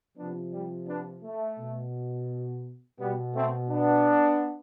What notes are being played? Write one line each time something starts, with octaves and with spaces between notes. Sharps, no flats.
C3 F3 B3 D4
G3
B3 D4
A3
B2
B2 G3 B3
A3 C4
B3 D4